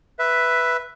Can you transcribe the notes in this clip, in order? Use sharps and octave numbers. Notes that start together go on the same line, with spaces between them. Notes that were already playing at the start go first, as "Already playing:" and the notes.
B4 E5